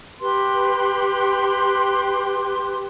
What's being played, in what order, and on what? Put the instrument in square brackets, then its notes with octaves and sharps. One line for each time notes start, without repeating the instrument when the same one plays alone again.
[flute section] G4 B4 C6